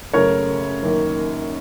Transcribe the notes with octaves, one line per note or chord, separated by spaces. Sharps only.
F#2 C#3 A3 A#4 C#5
F#2 D#3 A#3